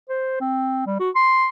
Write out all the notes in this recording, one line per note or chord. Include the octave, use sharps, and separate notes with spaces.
C5
C4
G3
F#4
C6